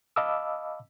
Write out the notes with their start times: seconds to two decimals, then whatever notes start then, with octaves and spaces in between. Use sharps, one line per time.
0.16 D#5 F5 A5 B5 D6 E6